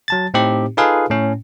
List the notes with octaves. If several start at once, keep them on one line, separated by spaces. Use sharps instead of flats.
F#3 A5 A6
A2 C4 D#4 G4
D#4 F4 G#4 A4 B4 F5
A2 C#4